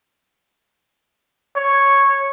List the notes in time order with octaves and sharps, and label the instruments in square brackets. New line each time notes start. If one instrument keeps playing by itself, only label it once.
[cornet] C#5